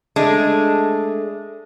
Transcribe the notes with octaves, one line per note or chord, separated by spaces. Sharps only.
G#3 A3 D4